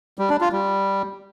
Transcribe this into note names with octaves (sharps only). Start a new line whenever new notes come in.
G3
D4
F4
G3